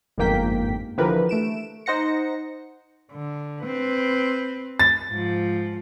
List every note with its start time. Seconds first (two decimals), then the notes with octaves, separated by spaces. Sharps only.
0.18 G1 F2 G#2 A#3 G5 B6
0.98 D3 E3 F3 G4 A#4 B4
1.29 A3 D7 E7
1.86 D#4 C5 F#5 A#6 C#7
3.12 D3
3.63 C4 B4
4.80 A6
5.10 G#2 F3